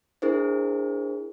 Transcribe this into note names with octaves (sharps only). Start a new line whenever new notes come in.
D4 E4 G#4 A#4 C5